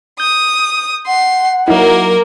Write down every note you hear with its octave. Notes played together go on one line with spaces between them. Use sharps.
D#6 G6
F#5 C6
F#3 A#3 D#4 E4 A#4